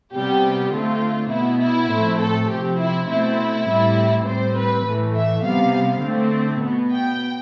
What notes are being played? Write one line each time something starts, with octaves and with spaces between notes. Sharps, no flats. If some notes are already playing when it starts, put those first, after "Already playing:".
C3 G3 B3 G4
D3 A3 C4 F4
B2 B3 E4
E4
A2 F3 A3 C4
A4
C3 F3 C4 G4
E4
B2 A3 C4 E4
A2 G3 C4
A2 G3 C4 C5
B4
A2 E3 A3
E5
C3 G3 B3 F5
D3 A3 C4
B2 B3
G5